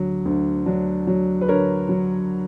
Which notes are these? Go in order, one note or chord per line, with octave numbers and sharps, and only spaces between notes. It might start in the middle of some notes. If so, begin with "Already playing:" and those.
Already playing: D2 D3 F#3
D2
F#3 D4
F#3
B4
D3 A#4 C#5
F#3